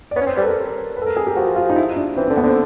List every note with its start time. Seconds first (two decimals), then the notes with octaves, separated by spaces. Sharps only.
0.11 D5
0.16 B3 C#5
0.21 C#4
0.26 C4 C5
0.36 G3 B4
0.42 A4
0.46 A#4
0.97 B4
1.02 A4
1.07 A#4
1.17 G#4
1.27 G4
1.36 F3 F#4
1.56 F4
1.70 D#4
1.76 E4
1.96 D4
2.16 E3 C4
2.27 D3 C4
2.37 B3
2.43 D3 C4